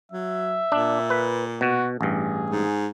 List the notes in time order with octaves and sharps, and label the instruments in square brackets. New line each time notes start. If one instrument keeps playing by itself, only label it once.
[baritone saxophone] F#3 [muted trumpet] E5
[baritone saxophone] A#2 [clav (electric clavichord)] D4
[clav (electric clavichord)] B4
[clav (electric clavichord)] B2 [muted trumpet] F#4
[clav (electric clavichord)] A1 G2 [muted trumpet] G#4
[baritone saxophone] G#2